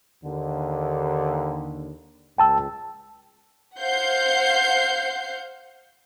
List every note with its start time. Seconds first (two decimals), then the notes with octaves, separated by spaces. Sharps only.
0.24 D#2 D3
2.38 C#2 G5 A5 E6
3.80 C5 F5 F#5 G6 C7